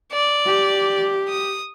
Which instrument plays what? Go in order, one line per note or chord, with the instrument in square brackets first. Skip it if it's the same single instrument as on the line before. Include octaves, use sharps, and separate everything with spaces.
[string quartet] D5
[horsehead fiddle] G4
[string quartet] D#6